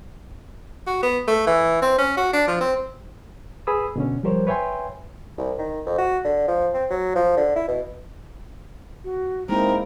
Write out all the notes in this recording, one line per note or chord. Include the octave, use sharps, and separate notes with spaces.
F#4
B3
A3
E3
C4
C#4
F#4
D4
F3
C4
G#4 B4 B5 D#6 E6
B2 D3 C#4
F3 G3 G4 A#4 C5 C#5
B4 C#5 E5 G5 G#5 C6
C2
D#3
F2
F#4
D3
F3
C4
F#3
F3
D3
E4
B2
F#4
G#3 A#3 C4 D#4 E4 A#4